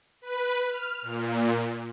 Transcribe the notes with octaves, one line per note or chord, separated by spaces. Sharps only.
B4
F6
A#2